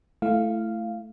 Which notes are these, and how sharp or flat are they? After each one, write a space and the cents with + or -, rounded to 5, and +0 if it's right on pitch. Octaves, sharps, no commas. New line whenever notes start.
A3 +0 E4 +20 F5 -5